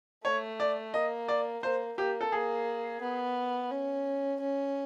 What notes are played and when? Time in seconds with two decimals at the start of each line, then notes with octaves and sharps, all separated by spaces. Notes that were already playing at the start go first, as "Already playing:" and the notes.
0.25 A3 C#5
0.60 D5
0.94 A#3 D#5
1.28 D5
1.63 A#3 C5
1.98 A#3 G4
2.21 A4
2.32 A#3 G#4
3.02 B3
3.71 C#4
4.40 C#4